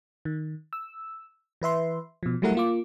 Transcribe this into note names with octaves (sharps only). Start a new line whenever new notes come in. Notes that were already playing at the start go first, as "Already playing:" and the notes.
D#3
E6
E3 B4 E5 C6
B2 F3
F#3 G3 A3 E4 A#4 F#5
A#3 F4 D6